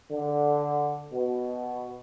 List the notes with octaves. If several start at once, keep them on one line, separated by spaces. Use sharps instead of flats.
D3
B2